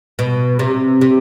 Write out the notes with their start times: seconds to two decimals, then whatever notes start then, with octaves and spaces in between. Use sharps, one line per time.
0.19 B2
0.59 C3
1.01 C3